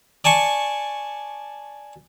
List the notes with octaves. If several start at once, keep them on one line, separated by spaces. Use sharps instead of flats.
D5 G#5 A5 C#6